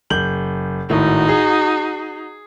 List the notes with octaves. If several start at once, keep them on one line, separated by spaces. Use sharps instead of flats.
F#1 G6 F#7
G#1 A2 D#4 F#4
G#4